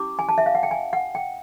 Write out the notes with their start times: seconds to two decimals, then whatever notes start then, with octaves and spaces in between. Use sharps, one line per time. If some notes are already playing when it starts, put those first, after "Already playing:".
Already playing: C#4 E4 G4 D6
0.19 G#5
0.29 A5
0.38 E5
0.46 F5
0.55 F#5
0.63 G5
0.71 G#5
0.93 F#5
1.15 G5